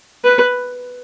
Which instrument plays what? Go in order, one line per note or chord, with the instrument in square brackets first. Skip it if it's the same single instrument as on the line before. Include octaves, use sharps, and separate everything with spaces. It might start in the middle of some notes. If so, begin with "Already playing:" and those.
[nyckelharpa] B4